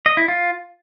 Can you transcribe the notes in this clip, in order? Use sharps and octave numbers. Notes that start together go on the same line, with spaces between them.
D#5
E4
F4